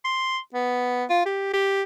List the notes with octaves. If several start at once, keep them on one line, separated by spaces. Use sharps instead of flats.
C6
B3
F4
G4
G4